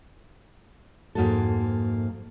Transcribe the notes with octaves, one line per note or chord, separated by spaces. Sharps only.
F2 G#2 A#3 D#4 F#4 A4